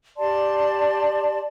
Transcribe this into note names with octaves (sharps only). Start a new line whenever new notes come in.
G4 D5 A5 C6